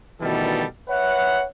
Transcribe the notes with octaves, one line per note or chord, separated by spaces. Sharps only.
D2 B2 D#3 E3 G3 A4
B4 C#5 E5 F#5